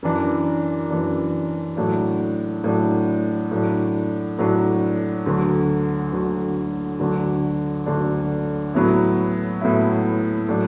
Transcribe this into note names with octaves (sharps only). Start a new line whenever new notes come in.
F#2 E3 D4
F#2 E3 D4
A2 F#3 D4
A2 F#3 D4
A2 F#3 D4
A2 F#3 D4
D2 D3 F#3
D2 D3 F#3
D2 D3 F#3 D4
D2 D3 F#3 D4
A2 F#3 B3 E4
A2 F#3 B3 E4
A2 F#3 D4